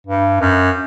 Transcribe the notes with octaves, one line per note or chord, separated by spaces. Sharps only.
G2
F#2